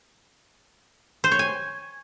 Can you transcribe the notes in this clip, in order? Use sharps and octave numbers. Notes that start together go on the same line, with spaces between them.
C5
C#5
G#5